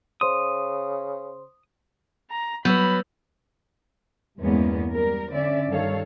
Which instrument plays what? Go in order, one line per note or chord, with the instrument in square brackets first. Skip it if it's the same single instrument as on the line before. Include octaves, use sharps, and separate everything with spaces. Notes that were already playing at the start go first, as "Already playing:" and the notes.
[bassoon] C#3 [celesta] C5 C6 [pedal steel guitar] D#6
[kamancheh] A#5
[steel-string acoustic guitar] F#3 [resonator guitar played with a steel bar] B3 [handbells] B4 E6 G6 [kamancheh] B5
[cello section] E2 G2 G#3 A#3 B3 C#4
G3 A#4
D3 C#4 D5 E5
G2 D#3 G3 A4 C#5 F5